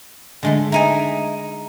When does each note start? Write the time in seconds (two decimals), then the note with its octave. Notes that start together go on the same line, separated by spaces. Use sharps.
0.43 D3 G#3 A3
0.72 D#4 E4 G#5 A#5